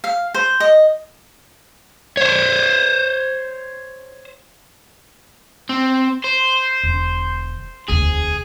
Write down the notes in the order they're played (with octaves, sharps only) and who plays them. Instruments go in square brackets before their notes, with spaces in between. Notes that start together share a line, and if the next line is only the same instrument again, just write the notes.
[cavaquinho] F5
C5
D#5
[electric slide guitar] C5 C#5
[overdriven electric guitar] C4
C5
[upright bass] E1 D3
[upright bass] E1 D2 [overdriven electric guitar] G#4